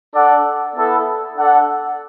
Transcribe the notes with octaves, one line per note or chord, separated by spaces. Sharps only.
D4 A4 D5 F#5
B3 E4 A4
D4 A4 F#5